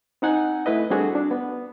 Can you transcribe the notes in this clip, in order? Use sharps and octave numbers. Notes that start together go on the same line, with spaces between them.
C4 D#4 F#5 G#5
A3 E4 B4 D#5
G3 C4 D4 F#4 G#4 A4
D4
B3